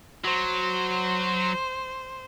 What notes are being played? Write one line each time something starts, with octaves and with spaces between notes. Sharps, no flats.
F#3 C5